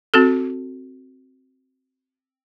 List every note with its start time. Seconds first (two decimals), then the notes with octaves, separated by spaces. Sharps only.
0.14 C4 F#4 A4